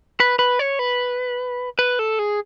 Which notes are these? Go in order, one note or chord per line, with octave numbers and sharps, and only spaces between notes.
B4
B4
C#5
B4
B4
A4
G#4